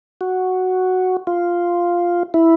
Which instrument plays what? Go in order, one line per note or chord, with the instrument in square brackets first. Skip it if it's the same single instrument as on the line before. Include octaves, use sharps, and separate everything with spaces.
[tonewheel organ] F#4
F4
E4